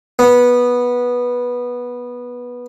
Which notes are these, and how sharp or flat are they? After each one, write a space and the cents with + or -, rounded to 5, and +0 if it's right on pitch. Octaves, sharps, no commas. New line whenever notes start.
B3 -10